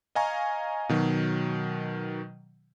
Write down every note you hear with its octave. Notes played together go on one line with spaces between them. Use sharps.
D#5 F5 G#5 A#5 C#6
B2 D#3 F#3